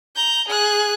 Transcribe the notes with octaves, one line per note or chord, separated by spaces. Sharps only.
A#5 G6
G#4 F#6